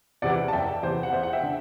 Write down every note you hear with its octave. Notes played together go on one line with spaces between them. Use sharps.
E2 C3 E3 D5 F#5
A5
F#1 E5 G5
E2 C3 E3 C5
F#5
E2 C5 E5
F#5
E5 G5
D3